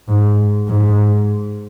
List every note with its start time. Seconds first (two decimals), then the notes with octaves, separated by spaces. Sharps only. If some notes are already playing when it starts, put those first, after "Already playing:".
0.09 G#2
0.69 G#2